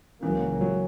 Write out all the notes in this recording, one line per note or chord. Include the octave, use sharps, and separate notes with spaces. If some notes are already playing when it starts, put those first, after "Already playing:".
C#2 C#3 E3 F#3 A#3
F#3